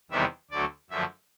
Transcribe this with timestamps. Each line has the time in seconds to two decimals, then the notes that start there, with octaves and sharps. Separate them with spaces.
0.11 E2 C3 D#3 G3 B3 E5
0.51 D2 D3 F#3 A3 D5
0.90 F#2 D3 F3 A3 E5